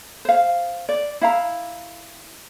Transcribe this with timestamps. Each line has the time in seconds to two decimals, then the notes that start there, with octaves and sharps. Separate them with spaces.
0.25 C5 F5
0.89 D5
1.21 E4 F5 A#5